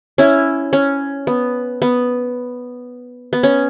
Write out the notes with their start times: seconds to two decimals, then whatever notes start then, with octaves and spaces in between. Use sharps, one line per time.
0.18 C#4 E4
0.73 C#4
1.27 B3
1.82 B3
3.33 B3
3.43 C#4